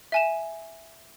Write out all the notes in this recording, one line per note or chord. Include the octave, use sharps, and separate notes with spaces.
E5 G#5 E7